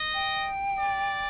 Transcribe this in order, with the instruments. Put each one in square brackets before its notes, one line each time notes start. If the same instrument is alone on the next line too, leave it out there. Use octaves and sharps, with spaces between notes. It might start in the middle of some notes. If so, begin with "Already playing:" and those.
Already playing: [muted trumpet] D#5
[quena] G5
[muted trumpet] D5